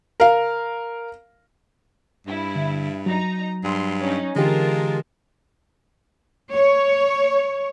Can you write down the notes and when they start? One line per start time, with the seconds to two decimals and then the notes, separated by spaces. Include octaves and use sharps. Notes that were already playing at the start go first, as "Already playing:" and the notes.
0.20 A#4 F5
2.27 G2 E4
2.56 D3
3.06 F#3 D#4 A#5
3.64 G2 C6
4.00 C#4 D#4
4.36 D3 E3 G#3 F4 G4 A#4 A5
6.54 C#5